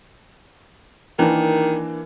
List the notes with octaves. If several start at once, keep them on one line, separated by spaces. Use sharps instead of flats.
D#3 E3 A#3 D4